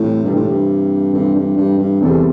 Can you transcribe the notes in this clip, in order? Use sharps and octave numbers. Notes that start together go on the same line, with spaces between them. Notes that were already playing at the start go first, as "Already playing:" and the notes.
Already playing: A2 C3 E3 G3 C4
G2 C3 E3 G3 C4 A4
A2
G2
G2 C3 E3 G3 C4 A4
G2
G2
G2
E2 C3 E3 G3 C4 A4